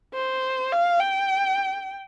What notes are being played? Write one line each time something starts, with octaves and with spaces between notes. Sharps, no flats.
C5
F5
G5